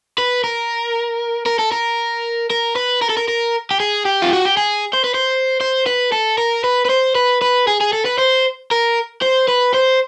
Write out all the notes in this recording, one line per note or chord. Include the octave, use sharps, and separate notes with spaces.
B4
A#4
A#4
A4
A#4
A#4
B4
A#4
A4
A#4
A#4
G4
G#4
G4
F4
F#4
G4
G#4
C5
B4
C5
C5
B4
A4
A#4
B4
B4
C5
B4
B4
G#4
G#4
A4
B4
C5
A#4
C5
B4
C5